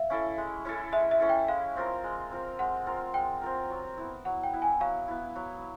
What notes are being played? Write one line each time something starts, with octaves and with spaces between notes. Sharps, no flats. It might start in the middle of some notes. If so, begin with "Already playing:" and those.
Already playing: E5 F5
C#4 E4 A4
G#3
C#4 E4 A4
G#3 E5
E5
C#4 E4 A4
G5
G#3 F5
C4 F4 A#4
G#3
C4 F4 A#4
G#3 F#5
C4 F4 A#4
G#3 G5
C4 F4 A#4
F#3
B3 E4
F#3 F#5
G5
B3 E4
G#5
F#3 F5
B3 E4
F#3